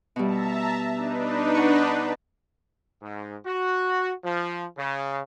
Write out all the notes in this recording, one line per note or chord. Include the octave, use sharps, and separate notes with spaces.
B2 G3 E5 A5 A#5
D4 D#4 B4
F#5 C#6
G#2
F#4
F3
C#3